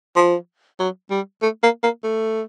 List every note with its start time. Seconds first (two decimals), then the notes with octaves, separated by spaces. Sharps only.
0.16 F3
0.79 F#3
1.11 G3
1.42 A3
1.63 A#3
1.83 A#3
2.04 A3